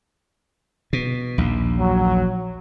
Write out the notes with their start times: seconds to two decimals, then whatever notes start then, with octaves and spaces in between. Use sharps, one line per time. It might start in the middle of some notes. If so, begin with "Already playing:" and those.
0.93 B2
1.38 A#1 D#2
1.79 F#3